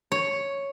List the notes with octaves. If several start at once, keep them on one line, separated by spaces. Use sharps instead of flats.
C#5